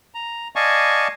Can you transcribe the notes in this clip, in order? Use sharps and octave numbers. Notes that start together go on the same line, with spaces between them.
A#5
D5 D#5 F5 G#5 A5 C#6